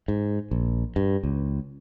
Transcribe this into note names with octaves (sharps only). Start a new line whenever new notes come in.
G#2
A#1
G2
C#2